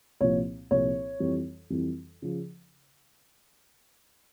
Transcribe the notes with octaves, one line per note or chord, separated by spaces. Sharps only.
C2 A#2 F3 C#5
C2 A#2 F3 C#5
F2 E3 G3
F2 E3 G3
C#3 F3